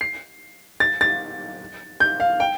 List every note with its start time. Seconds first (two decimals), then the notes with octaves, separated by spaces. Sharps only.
0.01 C7
0.80 A6
1.01 A6
2.00 G6
2.20 F5
2.40 G5